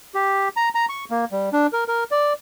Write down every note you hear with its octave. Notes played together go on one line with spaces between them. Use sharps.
G4
A#5
A#5
C#6
A#3
G3
D4
A#4
A#4
D5